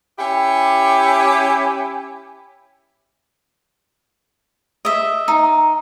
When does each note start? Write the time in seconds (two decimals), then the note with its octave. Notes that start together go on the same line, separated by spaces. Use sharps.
0.18 C#4 E4 G4
4.85 D#5 E5
5.28 D#4